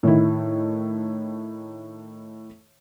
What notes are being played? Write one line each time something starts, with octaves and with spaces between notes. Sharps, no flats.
A2 D#3 E4